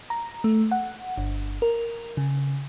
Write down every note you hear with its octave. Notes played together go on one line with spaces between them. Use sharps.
A#5
A3
F#5
G1
A#4
C#3